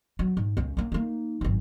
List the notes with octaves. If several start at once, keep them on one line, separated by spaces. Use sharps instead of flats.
F#3
G#2
C#2 C#4
A#3 C#4
A#3 D#4
G#1 F#2